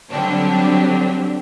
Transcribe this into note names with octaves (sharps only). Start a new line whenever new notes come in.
D3 F#3 G3 C4 D4 G4